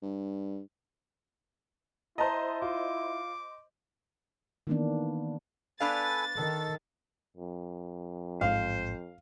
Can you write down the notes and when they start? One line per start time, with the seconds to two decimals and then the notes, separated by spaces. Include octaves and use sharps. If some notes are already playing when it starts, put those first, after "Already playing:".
0.02 G2
2.18 E4 C5 D#5 A5 A#5
2.62 F4 D6
4.67 D#3 E3 A#3 B3 D4
5.80 B3 D4 A4 B4 F5 G#5 A6
6.37 D#3 A4
7.37 F2
8.41 A1 G#2 G#3 C5 F5